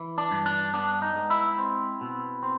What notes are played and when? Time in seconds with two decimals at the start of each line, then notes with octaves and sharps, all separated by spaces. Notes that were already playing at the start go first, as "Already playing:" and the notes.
Already playing: E3
0.18 D4
0.31 G2
0.46 D4
0.74 B3 D4
1.02 D#4
1.16 G#3
1.30 E4
1.58 C4
2.01 B2
2.43 C4